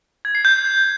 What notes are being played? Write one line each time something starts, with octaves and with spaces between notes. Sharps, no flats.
G#6
C7
G6